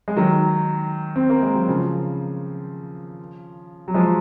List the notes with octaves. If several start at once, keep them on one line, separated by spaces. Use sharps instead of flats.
G#3
D#3 F#3
C4
A#3
G#3
F#3
C#3 F3
F#3
F3 G#3